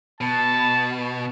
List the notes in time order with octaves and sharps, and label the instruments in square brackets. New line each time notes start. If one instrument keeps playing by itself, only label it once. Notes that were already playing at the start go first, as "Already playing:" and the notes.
[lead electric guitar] B2 [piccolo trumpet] A5